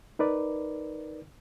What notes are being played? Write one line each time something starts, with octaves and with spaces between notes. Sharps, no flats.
D#4 A#4 B4 D5